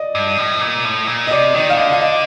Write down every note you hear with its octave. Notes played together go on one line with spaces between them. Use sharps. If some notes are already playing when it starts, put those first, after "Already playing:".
Already playing: D5 D#5
G2
A2
A#2
A2
A#2
D#5
C3 D5
D#3 D5
F5
D3 D#5
F5
D#5